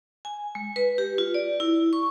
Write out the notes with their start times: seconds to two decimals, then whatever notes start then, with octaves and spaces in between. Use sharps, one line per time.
0.25 G#5
0.55 G#3
0.76 B4
0.98 G4
1.18 F4
1.34 D5
1.60 E4
1.93 C#6